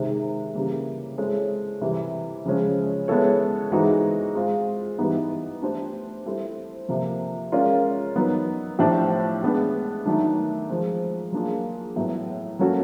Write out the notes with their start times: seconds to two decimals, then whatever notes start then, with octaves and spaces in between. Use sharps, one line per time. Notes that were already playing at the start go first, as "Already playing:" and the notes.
Already playing: C3 D#3 G#3 C4
0.54 C#3 E3 G3 A#3
1.18 G#3 C4 E4 A4 C#5
1.81 C3 E3 G3
2.45 C#3 F3 G#3 C#4
3.08 G#3 B3 E4 A4 C#5
3.72 E3 G#3 C4 D#4 F#4
4.35 G#3 C4 F4
4.98 E3 G3 B3 D#4
5.62 A3 D4 G4 C5
6.26 G3 C4 E4 A4 C5
6.88 C3 F3 A#3
7.52 G#3 C#4 F4 A#4 D5
8.16 F#3 B3 D#4
8.79 A2 F3 A3 D4 G4
9.43 G#3 B3 D4
10.06 D#3 F#3 A3 D4
10.69 F3 G#3 C4
11.32 F#3 A#3 D4 F4 G#4
11.96 A2 F#3 B3
12.59 F#3 A#3 C#4 F#4 A4